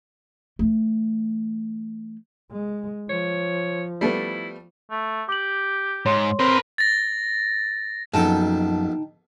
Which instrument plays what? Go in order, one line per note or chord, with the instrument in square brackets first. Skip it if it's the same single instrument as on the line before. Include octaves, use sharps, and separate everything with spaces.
[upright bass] E3 A3
[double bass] G#3
[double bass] F3 [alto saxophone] C#5
[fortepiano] G3 A3 B3 [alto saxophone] E4
[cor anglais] A3
[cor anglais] G4 [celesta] D6 F#7
[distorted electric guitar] G#2 [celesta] C#5 C6
[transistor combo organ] C4 [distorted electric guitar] A#4 B4
[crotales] A6 A#6
[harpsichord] A#1 B2 A4 [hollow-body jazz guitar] F#2 [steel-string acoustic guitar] D#4 G5 A5